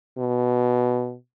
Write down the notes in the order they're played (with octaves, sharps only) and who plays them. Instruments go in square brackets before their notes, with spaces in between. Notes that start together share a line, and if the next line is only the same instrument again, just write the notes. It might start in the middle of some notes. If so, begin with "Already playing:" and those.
[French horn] B2